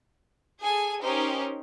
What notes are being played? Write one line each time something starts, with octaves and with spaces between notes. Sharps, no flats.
G#4 A4 G#5
C#4 D#4 G4 A#4 C5